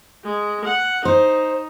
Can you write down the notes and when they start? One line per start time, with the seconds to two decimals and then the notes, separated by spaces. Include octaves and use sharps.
0.24 G#3
0.65 F#5
1.05 D#4 C5